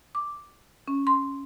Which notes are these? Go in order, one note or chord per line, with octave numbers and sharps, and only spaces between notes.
D6
C#4
C6